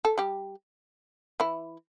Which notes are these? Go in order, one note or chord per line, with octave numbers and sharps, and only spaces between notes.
A4
G3 G4
E3 E4